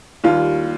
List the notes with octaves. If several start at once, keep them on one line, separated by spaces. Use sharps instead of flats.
D#2 D#3 G3 F4